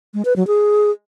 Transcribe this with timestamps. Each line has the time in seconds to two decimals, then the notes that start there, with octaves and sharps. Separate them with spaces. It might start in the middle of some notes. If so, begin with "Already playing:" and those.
0.14 G#3
0.25 B4
0.36 F#3
0.47 G#4